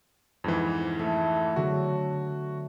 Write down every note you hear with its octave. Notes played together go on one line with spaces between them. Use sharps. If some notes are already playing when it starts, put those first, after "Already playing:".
F2 G#2 E3
A3
D3 F#3 F#4